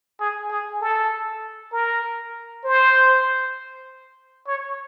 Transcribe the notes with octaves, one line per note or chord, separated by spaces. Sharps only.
G#4
G#4
A4
A#4
C5
C#5